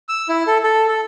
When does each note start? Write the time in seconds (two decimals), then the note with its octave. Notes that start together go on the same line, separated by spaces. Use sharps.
0.09 E6
0.29 E4
0.47 A4
0.64 A4
0.89 A4